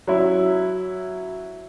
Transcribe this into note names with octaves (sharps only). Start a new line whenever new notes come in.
F#3 C#4 E4